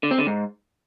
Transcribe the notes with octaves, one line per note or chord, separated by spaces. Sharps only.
D3
C4
D3
G#2